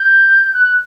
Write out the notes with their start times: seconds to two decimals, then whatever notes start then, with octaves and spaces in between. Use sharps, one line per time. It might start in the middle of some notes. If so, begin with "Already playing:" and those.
Already playing: G6
0.54 F#6